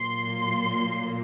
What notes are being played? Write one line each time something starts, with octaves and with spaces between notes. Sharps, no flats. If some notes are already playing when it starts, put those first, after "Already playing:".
Already playing: A#2 F#3 A#3 C6